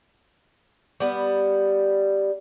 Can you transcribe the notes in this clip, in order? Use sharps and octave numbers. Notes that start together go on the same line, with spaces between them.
G3 B3